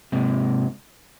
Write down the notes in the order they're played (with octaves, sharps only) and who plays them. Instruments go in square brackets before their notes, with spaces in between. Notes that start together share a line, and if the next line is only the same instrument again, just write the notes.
[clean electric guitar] G#2 C3